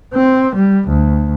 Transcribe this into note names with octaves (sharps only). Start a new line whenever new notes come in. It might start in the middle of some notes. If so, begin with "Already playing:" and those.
C4
G3
D2